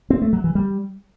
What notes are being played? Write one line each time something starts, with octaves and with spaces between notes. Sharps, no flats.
C4
A3
F#3
E3
G3